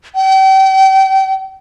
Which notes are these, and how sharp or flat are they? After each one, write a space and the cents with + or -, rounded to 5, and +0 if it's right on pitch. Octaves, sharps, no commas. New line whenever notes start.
G5 -35